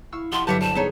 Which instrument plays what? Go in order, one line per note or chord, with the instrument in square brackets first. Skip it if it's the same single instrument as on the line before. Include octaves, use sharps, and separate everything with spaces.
[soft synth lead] E4 [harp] F5 C#6 E6
[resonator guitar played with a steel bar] F3 [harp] E4 G4 D#5 [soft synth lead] F#5 [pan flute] C6
[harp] G1 F#3 G6 [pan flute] G4 [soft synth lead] B4 [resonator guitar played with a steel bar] E5 F#5 A5
[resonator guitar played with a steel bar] G3 [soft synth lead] C5 [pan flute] A5
[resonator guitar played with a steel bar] B3 D#4 C#5 [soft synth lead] G#4 [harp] C5